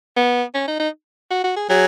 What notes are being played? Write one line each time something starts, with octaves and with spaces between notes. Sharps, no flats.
B3
C#4
D#4
D#4
F#4
F#4
G#4
F#3 G#4